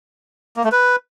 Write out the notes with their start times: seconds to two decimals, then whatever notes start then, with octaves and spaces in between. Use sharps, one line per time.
0.57 A#3
0.64 A3
0.72 B4